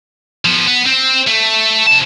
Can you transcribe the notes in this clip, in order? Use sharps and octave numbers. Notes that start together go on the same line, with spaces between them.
F3 B3
B3
C4
A3
C3 A5